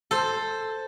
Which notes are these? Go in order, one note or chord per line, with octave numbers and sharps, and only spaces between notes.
A4 C5